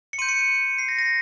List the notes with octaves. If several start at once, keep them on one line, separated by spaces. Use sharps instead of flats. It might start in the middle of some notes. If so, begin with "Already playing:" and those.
C#7
C6 G6 D#7
C#7
D#7
C7
A#6
A#6